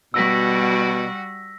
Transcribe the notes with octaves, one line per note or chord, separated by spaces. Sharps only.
B2 G3 F#4 F#5 E6 A#6 B6